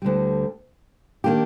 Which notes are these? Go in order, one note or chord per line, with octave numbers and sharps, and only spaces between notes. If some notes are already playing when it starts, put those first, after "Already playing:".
D2 D3 G3
D#3 A#3 D4 G4